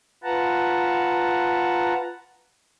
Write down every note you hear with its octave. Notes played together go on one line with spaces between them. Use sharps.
F4 B4 F#5 A5 A#5